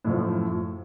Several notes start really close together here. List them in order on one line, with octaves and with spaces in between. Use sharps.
A2 F#2 F3